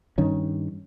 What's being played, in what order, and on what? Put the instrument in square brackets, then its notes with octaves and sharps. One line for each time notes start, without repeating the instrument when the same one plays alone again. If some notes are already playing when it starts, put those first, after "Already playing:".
[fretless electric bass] G2 D#3 C#4